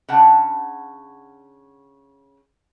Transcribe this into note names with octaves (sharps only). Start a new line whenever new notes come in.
C#3 D4 F#5 A5